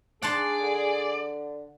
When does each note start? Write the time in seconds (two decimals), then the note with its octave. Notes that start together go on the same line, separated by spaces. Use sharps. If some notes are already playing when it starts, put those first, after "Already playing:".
0.22 D4 G#4 D5 F#5 A5 C6
0.62 D3